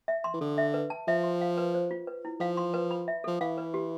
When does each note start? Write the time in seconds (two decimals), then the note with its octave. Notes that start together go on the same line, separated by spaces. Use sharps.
0.08 E5
0.24 C6
0.34 E3
0.41 D3 A4
0.58 E5
0.74 B4
0.90 A5
1.08 F3 E5
1.24 C6
1.41 F5
1.58 B4
1.74 C5
1.91 F4
2.07 B4
2.25 E4
2.40 F3 F5
2.57 C6
2.74 B4
2.91 B5
3.08 E5
3.24 F3 A4
3.41 E3 F5
3.58 B4
3.74 G4